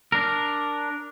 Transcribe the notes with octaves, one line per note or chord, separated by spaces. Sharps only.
D4 A#4